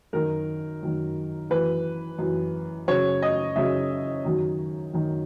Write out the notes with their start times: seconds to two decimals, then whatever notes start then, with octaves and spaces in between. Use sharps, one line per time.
0.13 F#2 D#3 F#3 A#4
0.83 F#2 D#3 F#3
1.50 F#2 E3 B4
2.18 F#2 E3
2.88 F#2 C#3 F#3 C#5
3.22 D#5
3.56 F#2 C#3 F#3 E5
4.25 F#2 D#3 F#3
4.93 F#2 D#3 F#3